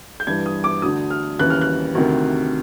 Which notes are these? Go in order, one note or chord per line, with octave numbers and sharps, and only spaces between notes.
G6
G2 E3 G#6
D#6
D6
D2 D3 D#6
F6
D#2 C#3 E3 F#6
F6
F#6
D2 C3 D#3